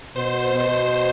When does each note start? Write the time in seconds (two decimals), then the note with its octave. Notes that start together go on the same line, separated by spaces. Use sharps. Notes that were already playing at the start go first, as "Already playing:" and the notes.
0.16 B2 C5
0.55 B2